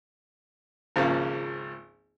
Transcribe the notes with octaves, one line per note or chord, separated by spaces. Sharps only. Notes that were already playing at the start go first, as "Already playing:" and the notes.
G#1 C#2 C#3 F3 A#3